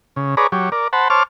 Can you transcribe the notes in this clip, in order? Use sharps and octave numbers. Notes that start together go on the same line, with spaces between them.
C#3
G#4 B4 C#5 D5 A#5
F#3 G4 C#5
A#4 D5
C5 F#5 A5 B5
C5 C#5 A5 D6 F6